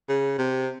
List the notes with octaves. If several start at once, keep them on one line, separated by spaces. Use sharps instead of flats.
C#3
C3